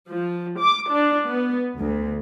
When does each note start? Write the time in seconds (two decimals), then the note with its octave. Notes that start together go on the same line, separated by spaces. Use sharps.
0.11 F3
0.60 D6
0.90 D4
1.27 B3
1.76 D2